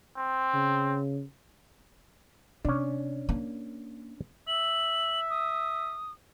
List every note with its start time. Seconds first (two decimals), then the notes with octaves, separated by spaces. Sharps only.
0.17 C4
0.54 C#3
2.65 C3 C#4 D4
3.29 A#3
4.48 E5 F#7
5.30 D#6